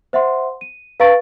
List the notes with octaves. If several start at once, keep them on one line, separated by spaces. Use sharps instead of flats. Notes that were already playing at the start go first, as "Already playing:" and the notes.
C5 E5 F#5 C6
D#7
B4 F5 A#5 C#6 A6 D7